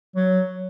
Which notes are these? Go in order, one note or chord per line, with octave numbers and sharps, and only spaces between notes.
F#3